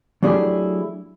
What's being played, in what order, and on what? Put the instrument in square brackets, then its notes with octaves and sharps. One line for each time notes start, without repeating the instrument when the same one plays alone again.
[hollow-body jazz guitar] F#3 A3 D4 E4 G4 G#4